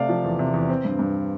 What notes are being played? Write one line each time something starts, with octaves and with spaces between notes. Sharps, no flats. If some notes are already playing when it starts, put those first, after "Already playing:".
Already playing: C3 A3 D5 F5
F3
E2
C3
E2
C4
G2
G2